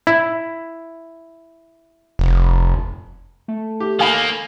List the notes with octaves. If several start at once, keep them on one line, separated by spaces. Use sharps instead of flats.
E4
F1
A3
G4
D#3 A#3 F5 G#5 B5